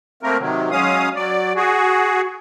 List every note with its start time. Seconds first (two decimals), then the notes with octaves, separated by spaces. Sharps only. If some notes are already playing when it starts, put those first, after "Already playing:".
0.23 A3 A#3 C4 A#4
0.39 C3 D#3 F#3
0.71 F#3 G#3 C#4 F5 D#6
1.16 F#3 D5
1.56 F#4 G#4